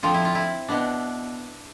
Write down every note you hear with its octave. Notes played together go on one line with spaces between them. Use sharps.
D3 F3 C4 F4
E4
F4
E4
B2 B3 D4